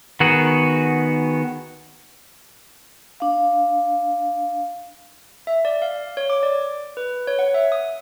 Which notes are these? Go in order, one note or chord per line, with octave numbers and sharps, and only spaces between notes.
D#3 B3 F#4 G#4
D4 F5
E5
D5
F5
C#5
D6
D5
B4
C#5
F#5
E5
D#6